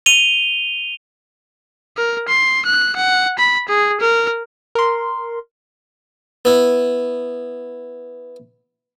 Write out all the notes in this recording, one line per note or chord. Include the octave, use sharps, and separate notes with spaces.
D#7 F7 G7
A#4
C6
F#6
F#5
B5
G#4
A#4
A#4 C6
B3 E4